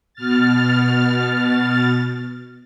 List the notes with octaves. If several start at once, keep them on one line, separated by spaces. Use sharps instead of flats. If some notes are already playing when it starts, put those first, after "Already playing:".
B2 F6 A6